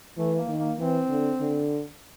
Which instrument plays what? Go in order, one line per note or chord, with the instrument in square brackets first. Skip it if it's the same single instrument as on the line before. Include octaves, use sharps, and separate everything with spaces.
[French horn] E3 [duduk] A3
[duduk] A#3
[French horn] D#3
[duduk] A#3
[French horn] E3 [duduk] C4
[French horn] D3
D3